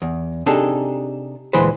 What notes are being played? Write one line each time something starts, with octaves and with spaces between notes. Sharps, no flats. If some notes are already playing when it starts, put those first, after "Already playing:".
E2
C3 D4 D#4 G#4 A4
D2 A#2 E3 G#3 B4 C5